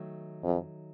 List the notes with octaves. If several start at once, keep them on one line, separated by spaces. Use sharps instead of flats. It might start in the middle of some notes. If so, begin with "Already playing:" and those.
Already playing: D#3 F#3 A3
F2